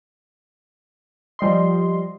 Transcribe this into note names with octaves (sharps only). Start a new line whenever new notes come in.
F3 G3 D#5 C6